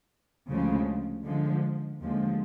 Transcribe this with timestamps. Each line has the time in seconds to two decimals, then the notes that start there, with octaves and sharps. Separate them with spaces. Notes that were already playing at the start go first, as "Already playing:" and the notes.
0.49 D2 C#3 F3 G#3
1.26 D3 F3 G#3
2.01 D#2 D3 F3 G#3